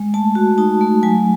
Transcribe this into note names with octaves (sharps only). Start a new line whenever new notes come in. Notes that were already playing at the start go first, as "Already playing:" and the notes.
Already playing: G#3
A3 A5
F#4
D#4 A5
A3
F#3 G#5